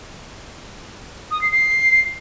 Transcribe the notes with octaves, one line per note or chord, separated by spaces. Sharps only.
D#6
C7
C7